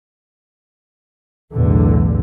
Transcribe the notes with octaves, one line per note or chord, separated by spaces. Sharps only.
B1 E2 A2 D3